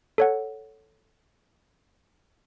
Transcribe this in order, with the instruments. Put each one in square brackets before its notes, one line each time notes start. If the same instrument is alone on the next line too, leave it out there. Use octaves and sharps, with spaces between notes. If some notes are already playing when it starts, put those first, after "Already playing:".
[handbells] A4 C#5 F#5